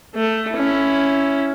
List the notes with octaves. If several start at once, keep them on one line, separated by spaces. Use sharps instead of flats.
A3
C#4 E4